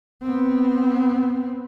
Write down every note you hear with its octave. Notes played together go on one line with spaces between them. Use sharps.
B3 C4